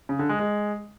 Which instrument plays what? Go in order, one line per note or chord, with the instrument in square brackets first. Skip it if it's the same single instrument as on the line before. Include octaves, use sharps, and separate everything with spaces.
[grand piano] C#3
D3
G#3
G#3